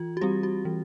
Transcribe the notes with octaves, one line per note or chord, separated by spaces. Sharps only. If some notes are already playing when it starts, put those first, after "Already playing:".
Already playing: E3 F4
F#4
G3 C4 G4
F#4
E3